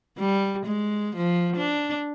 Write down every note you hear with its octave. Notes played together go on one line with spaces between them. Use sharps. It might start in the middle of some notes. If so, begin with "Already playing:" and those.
G3
G#3
F3
D4